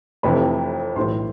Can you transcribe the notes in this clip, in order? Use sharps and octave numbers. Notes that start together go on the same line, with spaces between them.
F1 F2 C3 E3 B4 B5
B1 A2 E3 C5 C6